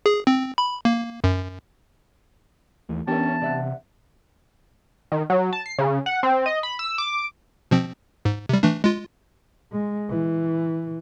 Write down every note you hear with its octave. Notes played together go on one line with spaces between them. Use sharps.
G#4
C4
B5
A#3
F#2
D#2 E3 A3
E3 B3 C#4 D4 G4 A#4 E5 A5
C3 D5 E5 F#5
D#3
F#3
A5
C7
C#3
F#5
C4
D#5
B5
E6
D6
B2 F3 C4
G#2
C3 G3
E3 A3 D4
G#3 F4
G#3
E3